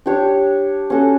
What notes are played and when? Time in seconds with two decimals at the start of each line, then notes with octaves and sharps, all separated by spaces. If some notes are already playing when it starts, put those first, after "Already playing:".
0.06 D4 G4 C#5
0.90 C#4 F#4 A4